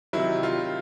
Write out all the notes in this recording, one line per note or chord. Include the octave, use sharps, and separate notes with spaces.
C3 D#3 F#3 E4
F4